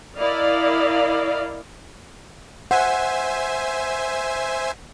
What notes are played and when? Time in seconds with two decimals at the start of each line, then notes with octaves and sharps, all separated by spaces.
0.18 E4 A#4 D5 D#5 F5
2.71 C5 E5 F#5 G#5